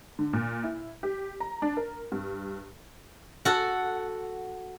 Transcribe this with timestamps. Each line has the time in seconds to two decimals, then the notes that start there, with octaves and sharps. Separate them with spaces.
0.19 D3
0.33 A#2
0.63 E4
1.03 G4
1.40 A#5
1.62 D4
1.77 A#4
2.12 G2
3.45 F#4 A4 F#5